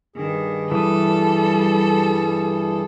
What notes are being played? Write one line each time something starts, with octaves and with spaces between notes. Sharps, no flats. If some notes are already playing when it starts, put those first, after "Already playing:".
G2 D#3 G#4
E3 G3 A4 D#6